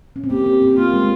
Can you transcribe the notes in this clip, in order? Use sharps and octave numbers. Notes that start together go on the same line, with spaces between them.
C#4
C4
A#3 G4
C4
C4
A#3 F4
G#3